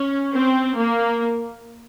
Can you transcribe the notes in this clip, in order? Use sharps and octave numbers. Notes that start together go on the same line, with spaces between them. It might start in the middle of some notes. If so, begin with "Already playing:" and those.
Already playing: C#4
C4
A#3